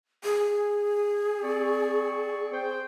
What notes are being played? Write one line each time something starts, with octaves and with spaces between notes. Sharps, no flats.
G#4
C4 D5 C#6
C5 G5